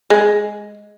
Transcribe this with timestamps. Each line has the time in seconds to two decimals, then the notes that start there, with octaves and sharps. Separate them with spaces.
0.10 G#3